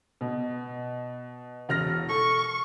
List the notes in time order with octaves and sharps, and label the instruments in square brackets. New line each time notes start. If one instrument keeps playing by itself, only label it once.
[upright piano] B2
E1 F6 A#6
[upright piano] A4 [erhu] C#6